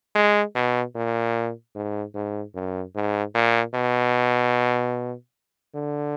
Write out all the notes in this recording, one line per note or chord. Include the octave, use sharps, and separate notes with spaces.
G#3
B2
A#2
G#2
G#2
F#2
G#2
A#2
B2
D3